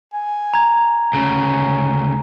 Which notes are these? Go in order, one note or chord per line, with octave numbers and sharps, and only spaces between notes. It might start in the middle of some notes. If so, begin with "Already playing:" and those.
G#5
A#5 G#6
D2 C#3 C#4